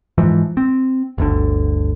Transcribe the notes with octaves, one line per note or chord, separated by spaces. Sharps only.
G#2 E3 F3
C4
G1 D2 D3